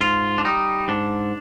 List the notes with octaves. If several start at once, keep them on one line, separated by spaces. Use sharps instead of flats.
G#2 F4
D4
G3 D#4
G#2 D4